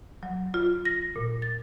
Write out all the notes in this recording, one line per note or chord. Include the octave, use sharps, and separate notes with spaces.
F#3
F4
A#6
A#2
A6